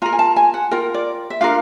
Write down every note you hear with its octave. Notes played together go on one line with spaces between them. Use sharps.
F4 A#4 A#5
G#5
A5
G#5
F#5
F4 A#4 G5
D5
E5
D4 F4 A#4 F5